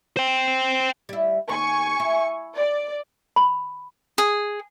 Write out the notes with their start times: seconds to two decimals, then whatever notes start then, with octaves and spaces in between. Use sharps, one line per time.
0.17 C5 G5
1.09 G3 E4
1.49 D#2 G#5 C#6
2.00 E4
2.54 D5
3.36 B5
4.18 G#4